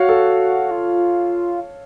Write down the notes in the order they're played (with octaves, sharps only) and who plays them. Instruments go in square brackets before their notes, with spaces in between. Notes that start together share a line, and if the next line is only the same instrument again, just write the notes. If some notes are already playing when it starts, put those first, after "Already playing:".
Already playing: [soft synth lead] F#4 [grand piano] C#5 F5
[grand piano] A4
[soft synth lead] F4